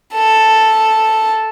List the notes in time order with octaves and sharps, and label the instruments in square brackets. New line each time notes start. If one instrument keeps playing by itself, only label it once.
[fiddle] A4